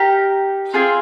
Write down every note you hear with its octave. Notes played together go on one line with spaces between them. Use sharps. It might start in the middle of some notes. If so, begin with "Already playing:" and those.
Already playing: D#4 G4 A#4
C4 F4 G#4